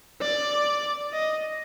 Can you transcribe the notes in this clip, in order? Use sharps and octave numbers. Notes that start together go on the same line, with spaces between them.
D5
D#5